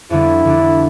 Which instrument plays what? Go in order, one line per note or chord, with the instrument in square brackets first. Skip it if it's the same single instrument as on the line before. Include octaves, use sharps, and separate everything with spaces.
[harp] F2 D3 G3 B3 D4 [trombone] E4
[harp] F2 D3 G3 B3 D4